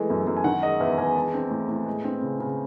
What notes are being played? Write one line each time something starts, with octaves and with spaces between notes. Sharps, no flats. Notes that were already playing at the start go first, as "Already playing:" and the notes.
Already playing: E3 G#3 A3
F#2
F#2
G#5
D#3 F#5
G#3 D#5
E2 E5
E2 G#5
G#3 A5
C4
A2
A2
G#3
C4
C#3
C#3